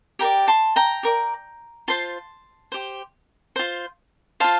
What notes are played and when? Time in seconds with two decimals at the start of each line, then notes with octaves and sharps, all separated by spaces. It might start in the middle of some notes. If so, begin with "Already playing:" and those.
0.19 G4 A#4 D5 G5 A#5
0.48 A5 C6
0.76 G5 A#5
1.03 G4 A#4 D5
1.88 F4 C5 A5 C6
2.72 G4 C5
3.56 F4 C5
4.40 F4 C5 F5 A5